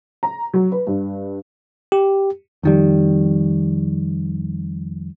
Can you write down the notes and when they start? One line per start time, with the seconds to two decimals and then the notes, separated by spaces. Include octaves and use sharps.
0.23 A#5
0.54 F#3
0.72 B4
0.87 G2
1.92 G4
2.63 F2 D#3 G3